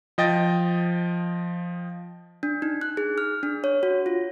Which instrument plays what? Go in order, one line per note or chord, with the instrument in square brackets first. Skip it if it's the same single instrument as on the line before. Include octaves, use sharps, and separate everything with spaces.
[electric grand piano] F3 D#5 G5 A6
[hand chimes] D4
D#4
F#6
G#4
F6
D4
C#5
F#4
F4